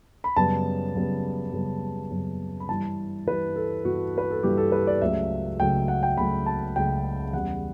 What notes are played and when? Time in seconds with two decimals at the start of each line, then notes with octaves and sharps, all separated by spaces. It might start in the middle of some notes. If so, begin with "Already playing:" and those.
0.24 B5
0.36 F#2 C#3 G3 B3 A5
0.95 F#2 C#3 G3 B3
1.53 F#2 C#3 G3 B3
2.11 F#2 C#3 G3 B3
2.60 B5
2.69 G2 E3 G3 A5
3.27 G2 E3 G3 B4
3.56 A4
3.85 G2 E3 G3 F#4
4.18 B4
4.31 A4
4.43 G2 E3 G3 G4
4.58 A4
4.72 B4
4.87 D5
5.01 C#2 C#3 F#3 A3 E5
5.60 C#2 C#3 F#3 A3 G5
5.88 F#5
6.03 G5
6.17 C#2 C#3 F#3 A3 B5
6.46 A5
6.76 C#2 C#3 F#3 A3 G5
7.33 E2 C#3 G3 C#4 F#5